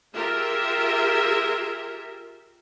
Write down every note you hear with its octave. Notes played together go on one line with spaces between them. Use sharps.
F4 G4 G#4 A#4 E5